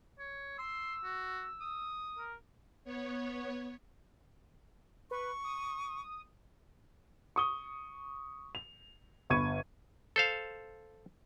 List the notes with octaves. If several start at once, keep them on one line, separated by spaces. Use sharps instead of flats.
C#5
C6 E6
F#4
D#6
A#4
B3 C#5
B4 C#6
D#6
C#6 D#6 G7
F7
G1 B5 C#6 G#6 D#7
A4 C5 F5